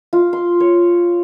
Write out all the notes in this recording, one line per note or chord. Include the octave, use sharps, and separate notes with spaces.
F4
C6
C#5